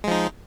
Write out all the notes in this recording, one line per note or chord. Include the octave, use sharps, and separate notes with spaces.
F3 G#3 D#4